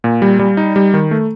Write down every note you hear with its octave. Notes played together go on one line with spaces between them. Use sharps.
A#2
G3
G3
D#4
G3
D#3
A3